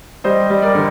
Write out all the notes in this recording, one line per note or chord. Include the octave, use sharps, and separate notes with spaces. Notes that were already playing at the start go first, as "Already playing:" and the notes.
G3 C5 D#5
G3
A#4 D5
D3